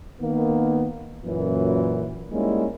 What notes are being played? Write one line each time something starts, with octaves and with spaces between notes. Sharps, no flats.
D#3 A#3 B3
F#2 A#2 E3
G3 G#3 A#3 C#4 D#4 E4